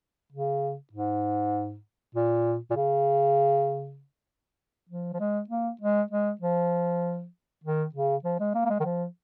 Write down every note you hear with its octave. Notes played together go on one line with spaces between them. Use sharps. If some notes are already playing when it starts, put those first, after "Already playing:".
C#3
G#2
A#2
A#2
C#3
F3
F3
G#3
A#3
G#3
G#3
F3
D#3
C#3
F3
G#3
A#3
A#3
G#3
D#3
F3